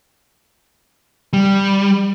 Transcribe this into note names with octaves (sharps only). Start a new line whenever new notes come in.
G3